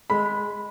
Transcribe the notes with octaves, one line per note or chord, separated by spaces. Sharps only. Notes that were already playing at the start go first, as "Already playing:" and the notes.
G#3 B5